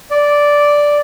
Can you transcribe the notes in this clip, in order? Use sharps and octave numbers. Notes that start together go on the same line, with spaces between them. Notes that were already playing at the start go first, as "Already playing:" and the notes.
D5